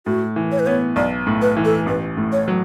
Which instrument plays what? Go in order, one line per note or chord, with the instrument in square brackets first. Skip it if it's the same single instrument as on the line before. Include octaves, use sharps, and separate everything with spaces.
[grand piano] A2 [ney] F#4
[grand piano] E3
[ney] C#5
B4
[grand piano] B3 [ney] C#5
[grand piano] B1 [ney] D5
[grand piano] A2
[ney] B4
[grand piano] E3
[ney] A4
[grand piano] A1 [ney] B4
[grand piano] A2
[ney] C#5
[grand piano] F#3